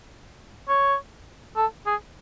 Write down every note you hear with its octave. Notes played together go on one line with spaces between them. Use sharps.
C#5
A4
G#4